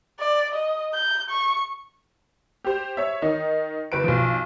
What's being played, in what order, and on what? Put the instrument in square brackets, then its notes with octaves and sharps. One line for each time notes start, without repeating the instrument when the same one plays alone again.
[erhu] D5
D#5
G6
C#6
[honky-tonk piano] G4 C5
C#5 E5
D#3 D#4
F#1 B4 D7
B1 F3